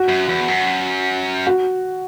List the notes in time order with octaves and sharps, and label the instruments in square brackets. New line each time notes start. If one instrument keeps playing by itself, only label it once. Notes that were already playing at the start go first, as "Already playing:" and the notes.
Already playing: [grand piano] F#4
[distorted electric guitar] F#2
E2
F#2
[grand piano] F#4